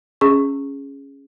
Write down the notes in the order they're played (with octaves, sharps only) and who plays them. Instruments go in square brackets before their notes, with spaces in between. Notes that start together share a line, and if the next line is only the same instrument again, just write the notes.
[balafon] C#4 G#4 C#6